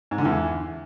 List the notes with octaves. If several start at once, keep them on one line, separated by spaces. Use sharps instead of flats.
G#2
D3
E2